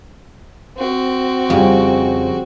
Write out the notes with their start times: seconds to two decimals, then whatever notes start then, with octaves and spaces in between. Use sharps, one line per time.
0.77 C4 F#4
1.50 F2 C#3 G3 C#4